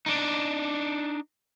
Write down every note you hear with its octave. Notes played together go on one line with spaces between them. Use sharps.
D4 D#4